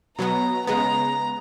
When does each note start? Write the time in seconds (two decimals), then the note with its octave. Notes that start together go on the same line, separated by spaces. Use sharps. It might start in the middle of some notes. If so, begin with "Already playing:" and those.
0.18 B2 F#3 B3 A#5
0.67 C#3 G#3 B3 A#5